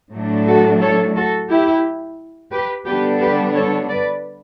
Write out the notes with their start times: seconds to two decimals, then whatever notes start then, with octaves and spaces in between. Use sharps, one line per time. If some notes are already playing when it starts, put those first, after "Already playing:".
0.12 A2 F#3 A3 D4
0.46 F#4 A4
0.81 A4 C#5
1.15 F#4 A4
1.49 E4 G4
2.52 G4 B4
2.86 D3 G3 B3 D4 G4 B4
3.20 G4 B4
3.54 A4 C#5
3.88 B4 D5